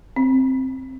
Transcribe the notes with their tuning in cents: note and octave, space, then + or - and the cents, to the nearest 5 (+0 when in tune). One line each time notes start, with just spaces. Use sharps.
C4 +5